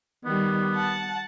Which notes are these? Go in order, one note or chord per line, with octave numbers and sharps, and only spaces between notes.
D#3 G3 B3
F#5 A5